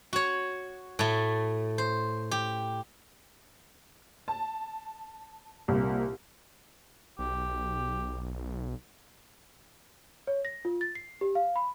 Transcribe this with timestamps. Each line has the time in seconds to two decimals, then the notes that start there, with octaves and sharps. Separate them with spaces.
0.13 F#4 C#5
0.99 A2 A3
1.78 C5
2.31 G4
4.28 A5
5.68 C2 A#2
7.19 B1 G4
10.27 C#5
10.45 A#6
10.65 F4
10.81 A6
10.95 C7
11.21 G4
11.35 F5
11.56 B5